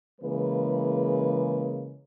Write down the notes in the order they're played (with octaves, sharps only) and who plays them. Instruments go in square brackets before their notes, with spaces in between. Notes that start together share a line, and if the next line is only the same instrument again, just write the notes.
[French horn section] C#3 E3 G#3 A#3 B4